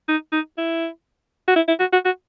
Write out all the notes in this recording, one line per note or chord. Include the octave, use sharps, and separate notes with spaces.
D#4
D#4
E4
F#4
E4
E4
F#4
F#4
F#4